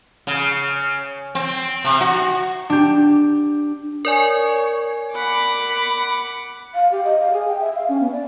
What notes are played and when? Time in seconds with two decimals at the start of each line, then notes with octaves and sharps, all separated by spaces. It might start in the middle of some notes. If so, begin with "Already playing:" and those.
0.27 C#3
1.35 C4
1.84 C3
2.01 F#4
2.70 D4 G4
4.05 A#4 C#5 D5 G#5
5.15 F#5 B5 D6
6.74 F5
6.92 G4
7.05 D#5
7.20 F5
7.33 G#4
7.48 G5
7.60 E5
7.75 F5
7.89 C#4
8.00 B3
8.12 D5